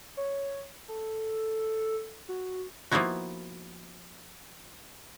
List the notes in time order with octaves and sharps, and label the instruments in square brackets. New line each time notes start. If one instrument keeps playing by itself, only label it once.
[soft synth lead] C#5
A4
F#4
[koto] F3 A#3 B3 D#4 E4 F#4